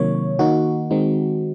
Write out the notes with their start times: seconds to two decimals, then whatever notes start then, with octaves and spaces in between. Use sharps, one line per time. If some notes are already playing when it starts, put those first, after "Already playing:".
Already playing: C3 D#3 F#3 A#3 C#5
0.39 D#3 A#3 D#4 F#4
0.91 D#3 G#3 C4 D#4